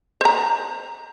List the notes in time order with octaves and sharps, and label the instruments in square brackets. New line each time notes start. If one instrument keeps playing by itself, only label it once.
[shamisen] C5 A#5